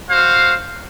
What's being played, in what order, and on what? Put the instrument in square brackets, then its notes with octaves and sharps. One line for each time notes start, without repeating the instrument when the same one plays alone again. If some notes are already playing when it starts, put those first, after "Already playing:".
[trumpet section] F#4 C5 F5